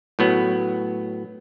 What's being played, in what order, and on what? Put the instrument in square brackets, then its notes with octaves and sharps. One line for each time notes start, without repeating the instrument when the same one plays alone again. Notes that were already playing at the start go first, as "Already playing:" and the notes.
[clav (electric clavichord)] A2 F#3 B3